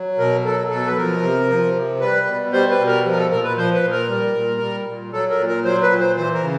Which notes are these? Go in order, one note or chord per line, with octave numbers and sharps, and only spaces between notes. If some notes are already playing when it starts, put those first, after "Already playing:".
Already playing: F#3
B2 A#4
F#3 A4
B2 A4
B4
F3 A#4
C3
F3
C3
G3 B4
B2
G3 C5
B4
B2
A#4
F3
A#4
A4
A#2 A#4
B4
F3 C5
B4
A#2
A#4
G3
A#2
G3
A#2
F#3 A4
A#4
A#2
A#4
F#3 C5
B4
A#2
C5
E3 C5
A#4
C#3